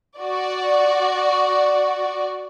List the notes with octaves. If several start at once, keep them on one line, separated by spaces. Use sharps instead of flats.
F#4 D5